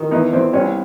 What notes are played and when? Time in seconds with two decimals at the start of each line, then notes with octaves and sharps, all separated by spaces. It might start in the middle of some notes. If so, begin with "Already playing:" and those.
Already playing: D#3
0.11 E2 D#4
0.33 E2 C4
0.53 C2 C#4